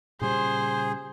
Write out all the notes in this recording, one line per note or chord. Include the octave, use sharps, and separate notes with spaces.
A#2 C#3 G3 G#4 C5